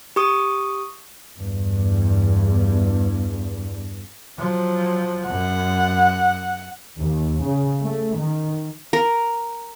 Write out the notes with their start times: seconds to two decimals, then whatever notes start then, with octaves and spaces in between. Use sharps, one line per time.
0.16 G4 C#6 D#6
1.39 E2 G2
4.38 F3 F#3
5.29 F#2 F#5
7.00 D#2
7.43 C#3
7.83 A3
8.16 D#3
8.93 A#4